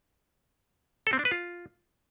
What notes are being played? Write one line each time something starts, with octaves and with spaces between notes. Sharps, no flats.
A4
C4
D4
B4
F4